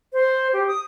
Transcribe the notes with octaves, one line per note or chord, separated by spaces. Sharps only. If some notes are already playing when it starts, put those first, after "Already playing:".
C5
G4
D#6